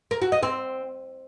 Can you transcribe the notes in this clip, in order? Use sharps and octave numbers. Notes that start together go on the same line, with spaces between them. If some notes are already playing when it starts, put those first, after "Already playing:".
A#4
F#4
D#5
C4